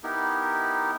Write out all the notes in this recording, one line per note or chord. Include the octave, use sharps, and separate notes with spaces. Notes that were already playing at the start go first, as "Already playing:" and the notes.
B3 D#4 E4 G4 A#4